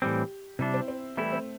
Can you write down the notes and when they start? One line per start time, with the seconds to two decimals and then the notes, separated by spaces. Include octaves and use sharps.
0.02 A2 E3 G3 C4 G4
0.59 C3 G3 D4 E4
0.74 C4
0.88 C4
1.17 E3 G3 A3 E4
1.32 C4